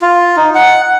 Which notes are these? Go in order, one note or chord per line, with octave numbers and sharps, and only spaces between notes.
F4
D#4
F#5